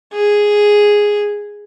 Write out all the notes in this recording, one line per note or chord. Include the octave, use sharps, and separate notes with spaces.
G#4